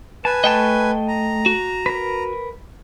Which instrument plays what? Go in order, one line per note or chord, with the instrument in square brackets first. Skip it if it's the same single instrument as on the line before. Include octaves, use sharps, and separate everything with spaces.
[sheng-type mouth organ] B4 G#5 [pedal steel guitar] A5
[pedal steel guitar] A3 [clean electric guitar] D#5 G5 A5
[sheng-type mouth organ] A#5
[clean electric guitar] F#4
[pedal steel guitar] A#4 B4